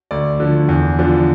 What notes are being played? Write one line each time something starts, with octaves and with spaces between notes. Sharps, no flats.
D2 D5
D3 F3
E2
D3 F3